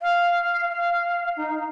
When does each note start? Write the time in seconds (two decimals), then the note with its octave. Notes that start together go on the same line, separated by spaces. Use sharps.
0.02 F5
0.69 F5
1.37 D#4